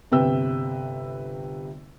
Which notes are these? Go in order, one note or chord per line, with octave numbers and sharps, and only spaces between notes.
G1 C3 C4 B4 G5 E6